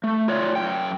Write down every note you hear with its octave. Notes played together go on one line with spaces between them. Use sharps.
A3
F4 C#5 D5
F#2 G5